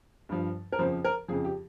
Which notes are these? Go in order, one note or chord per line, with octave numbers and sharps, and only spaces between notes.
G2 F3
A#4
F2 C#3 F3 C5
A#4
F2 C#3 F3 G#4
G4